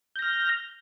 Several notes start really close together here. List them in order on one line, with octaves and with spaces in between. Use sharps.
G6 A#6 F6